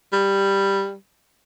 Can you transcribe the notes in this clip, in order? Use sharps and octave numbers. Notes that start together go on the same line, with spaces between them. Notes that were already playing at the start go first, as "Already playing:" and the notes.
G3